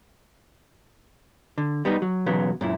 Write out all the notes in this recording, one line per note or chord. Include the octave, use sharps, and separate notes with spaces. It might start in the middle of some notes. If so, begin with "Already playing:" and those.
D3
G3 B3 D#4
F#3
B1 E2 C#3 F#3 B3
F#2 A#2 E4